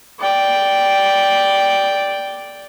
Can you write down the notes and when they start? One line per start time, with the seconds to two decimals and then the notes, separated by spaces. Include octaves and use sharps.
0.19 D5 G5